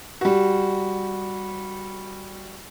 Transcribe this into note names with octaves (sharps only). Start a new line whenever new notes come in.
G3 F#4